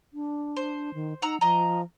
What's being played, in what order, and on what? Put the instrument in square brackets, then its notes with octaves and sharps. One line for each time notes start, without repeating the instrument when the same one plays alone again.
[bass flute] D4
[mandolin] C5
[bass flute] D#3
[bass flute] D#4 [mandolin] F#5 A#5 E6
[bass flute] F3 [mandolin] D#5 A#5